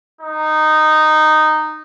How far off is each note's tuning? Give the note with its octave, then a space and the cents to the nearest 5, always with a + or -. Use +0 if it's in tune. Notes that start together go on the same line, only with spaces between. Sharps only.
D#4 -10